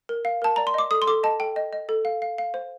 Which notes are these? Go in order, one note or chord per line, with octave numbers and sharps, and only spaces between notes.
A#4
F5
A#4 A5
D5 A#5
C6
D#5 D6
A4 D#6
C6
A4 D6
D#5 A5
A4 G5
D#5
D#5
A4
F5
F5
F5
C5